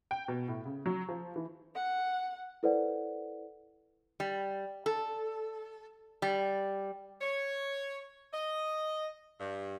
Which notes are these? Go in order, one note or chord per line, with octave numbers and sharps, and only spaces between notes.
G5
B2
A2
C#3
F#3
F3
E3
F#5
E4 A4 B4 C5 D5 F#5
G3
A4
G3
C#5
D#5
G2